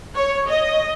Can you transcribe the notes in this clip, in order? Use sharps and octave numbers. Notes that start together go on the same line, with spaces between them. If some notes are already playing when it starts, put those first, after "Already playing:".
C#5
D#5